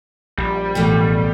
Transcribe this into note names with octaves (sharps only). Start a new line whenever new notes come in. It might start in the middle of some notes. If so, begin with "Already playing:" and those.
A#1 G3
A1 B2 E3 A3